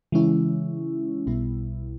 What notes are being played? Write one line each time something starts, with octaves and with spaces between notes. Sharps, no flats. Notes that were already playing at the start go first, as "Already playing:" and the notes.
C#3 E3 G#3 C#4 E4
B1 B2 G3 B3 E4